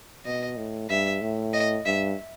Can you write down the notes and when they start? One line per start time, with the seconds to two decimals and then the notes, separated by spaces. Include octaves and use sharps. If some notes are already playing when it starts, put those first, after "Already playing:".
0.25 B2 D#5
0.57 A2
0.90 G2 E5
1.21 A2
1.54 D#5
1.86 G2 E5